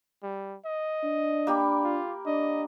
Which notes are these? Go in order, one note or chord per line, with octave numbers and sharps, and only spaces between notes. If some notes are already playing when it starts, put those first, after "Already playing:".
G3
D#5
D4
A#3 G4 B5
F4
D4 D#5